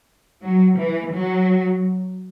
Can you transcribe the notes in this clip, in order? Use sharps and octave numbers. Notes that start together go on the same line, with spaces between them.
F#3
E3
F#3